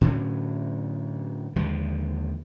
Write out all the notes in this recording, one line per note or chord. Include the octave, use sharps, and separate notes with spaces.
A2 D3 F#3 C#4
D#2 D3 F3 G#3